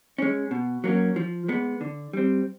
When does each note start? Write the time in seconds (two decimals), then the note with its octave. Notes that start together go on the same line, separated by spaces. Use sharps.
0.18 G#3 C#4
0.51 B2
0.84 F#3 A#3 C#4
1.16 F3
1.48 G#3 B3
1.81 D3
2.13 G3 C4